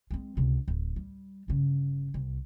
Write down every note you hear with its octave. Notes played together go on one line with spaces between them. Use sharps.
G#3 C4
C#2 C3
D1
G3
G1 C#3
C2